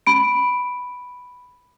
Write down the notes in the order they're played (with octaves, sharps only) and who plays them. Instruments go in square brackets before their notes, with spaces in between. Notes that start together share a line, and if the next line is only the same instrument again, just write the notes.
[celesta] B5 D7